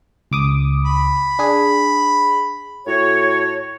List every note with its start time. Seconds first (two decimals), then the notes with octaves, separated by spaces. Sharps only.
0.31 C#2 D6 D#6
0.85 B5
1.39 D4 G#4
2.87 A2 F#4 C#5